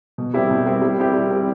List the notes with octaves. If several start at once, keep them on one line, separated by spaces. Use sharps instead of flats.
B2
G3 C4 E4 G4
B2
G3 C4 E4 G4
G3
C4 E4 G4
G3
C4 E4 G4